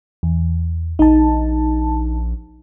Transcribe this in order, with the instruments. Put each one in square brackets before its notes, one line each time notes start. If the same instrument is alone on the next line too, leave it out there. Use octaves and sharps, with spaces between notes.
[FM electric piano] E2
[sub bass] A#1 [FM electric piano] D#4 A5